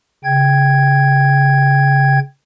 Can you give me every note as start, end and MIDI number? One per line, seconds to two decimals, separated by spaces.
0.24 2.19 49
0.24 2.19 79
0.24 2.19 92